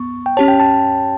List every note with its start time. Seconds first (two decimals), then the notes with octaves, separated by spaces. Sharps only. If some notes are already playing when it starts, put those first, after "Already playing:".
Already playing: B3 C#6
0.26 G5
0.37 C#4 G4 C#5 A5
0.48 G5
0.60 A5